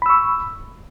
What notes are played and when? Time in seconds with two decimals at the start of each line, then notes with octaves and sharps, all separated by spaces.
0.02 B5
0.06 E6
0.10 C#6